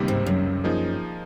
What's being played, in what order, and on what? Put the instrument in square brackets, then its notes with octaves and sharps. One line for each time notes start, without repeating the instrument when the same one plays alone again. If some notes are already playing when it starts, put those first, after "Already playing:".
Already playing: [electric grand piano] C#2 C3 D#3 G3 A#3
[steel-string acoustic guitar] G#2
F#2
[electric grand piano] F3 A#3 D#4 G#4